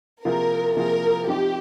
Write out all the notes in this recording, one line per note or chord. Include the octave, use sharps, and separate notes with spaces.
C3 F3 A#3 F4 G#4 A#4
C3 F3 A#3 F4 G#4 A#4
F3 C4 D#4 G4